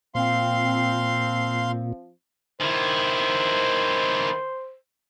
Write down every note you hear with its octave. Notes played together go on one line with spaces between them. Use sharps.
A#2 F3 C4 F5 C6
D#3 E4 C5